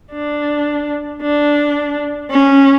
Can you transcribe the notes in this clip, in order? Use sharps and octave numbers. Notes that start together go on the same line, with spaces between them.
D4
D4
C#4